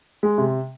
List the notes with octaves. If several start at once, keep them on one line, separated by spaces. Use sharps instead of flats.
G#3
C3